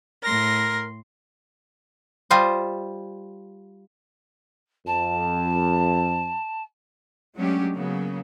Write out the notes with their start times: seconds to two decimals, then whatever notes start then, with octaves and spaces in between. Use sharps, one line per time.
0.23 A2 A#4 C6 A#6
2.31 G3 F4 C5 D#5
4.86 F2 A5
7.35 F#3 G#3 A3 C#4 D4 G4
7.74 C#3 F#3 A#3 B3